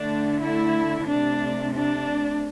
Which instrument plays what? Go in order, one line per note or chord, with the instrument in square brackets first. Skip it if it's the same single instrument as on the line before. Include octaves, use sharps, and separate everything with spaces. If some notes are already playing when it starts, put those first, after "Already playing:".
Already playing: [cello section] D3 A3 D4
E4
C3 A3 D4
D4